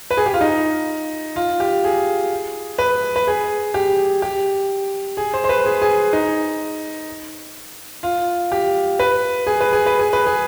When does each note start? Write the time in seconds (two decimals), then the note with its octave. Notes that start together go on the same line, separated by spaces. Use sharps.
0.11 B4
0.17 G#4
0.26 G4
0.34 F4
0.41 D#4
1.36 F4
1.60 G4
1.84 G#4
2.78 B4
3.16 B4
3.27 G#4
3.74 G4
4.22 G4
5.17 G#4
5.34 C5
5.44 C5
5.49 B4
5.66 G#4
5.82 G#4
6.13 D#4
8.03 F4
8.52 G4
8.99 B4
9.47 G#4
9.60 B4
9.73 G#4
9.86 B4
9.99 G#4
10.13 B4
10.26 G#4